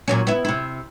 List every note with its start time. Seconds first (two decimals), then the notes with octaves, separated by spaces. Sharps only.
0.08 A#2 F#3 C#4
0.27 B3 E4
0.45 C3 E4